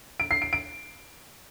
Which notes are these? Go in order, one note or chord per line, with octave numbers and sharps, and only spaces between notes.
D7
C7
D7
D7